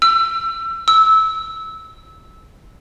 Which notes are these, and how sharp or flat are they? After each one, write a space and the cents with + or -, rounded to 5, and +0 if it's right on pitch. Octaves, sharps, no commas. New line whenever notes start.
E6 +30
E6 -15